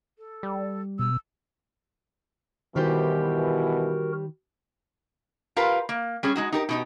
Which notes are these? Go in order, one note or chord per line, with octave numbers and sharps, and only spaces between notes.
A4
G3
B2 E6
B2 D#3 E3 G3 F#4 G4 A#4 C5
F4 G4 A#4 B4 F5
A#3
G3 C#4 G#4
G#3 D#4 F#4
D#4 G4 A#4
B2 D#4 G4